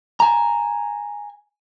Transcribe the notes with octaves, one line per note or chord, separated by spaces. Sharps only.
G#5 A#5